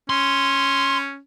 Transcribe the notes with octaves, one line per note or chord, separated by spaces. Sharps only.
C#4 C6